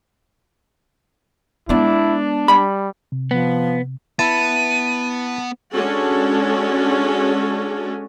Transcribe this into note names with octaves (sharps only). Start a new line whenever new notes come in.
G#3 B3 D4 E4
G3 B5
C3
F3 B3
B3 E4 A5 D#7
G#3 C#4 D4 F#4 A4